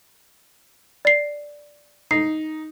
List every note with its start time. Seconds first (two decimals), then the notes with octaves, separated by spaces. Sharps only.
1.05 D5 C7
2.11 D#4 C7